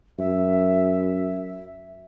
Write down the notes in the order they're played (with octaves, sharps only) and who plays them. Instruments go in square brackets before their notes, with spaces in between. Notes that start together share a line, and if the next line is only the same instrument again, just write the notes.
[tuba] F#2 [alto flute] E5